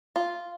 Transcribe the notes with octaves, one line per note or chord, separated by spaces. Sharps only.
F4